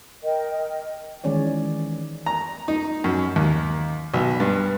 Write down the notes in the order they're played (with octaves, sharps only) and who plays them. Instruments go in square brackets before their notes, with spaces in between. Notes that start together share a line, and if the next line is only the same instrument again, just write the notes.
[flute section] A#4 D#5 G5
[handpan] D#3 E3 G#3 C#4 C#5 D5
[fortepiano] A#5
D#4
F#2
D#2
B1
G2